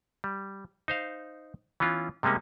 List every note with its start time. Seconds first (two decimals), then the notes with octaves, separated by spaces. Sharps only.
0.24 G3
0.88 D#4 C5 F5
1.80 E3 B3 C#4 F4
2.23 C3 G3 G#3 A#3 C#4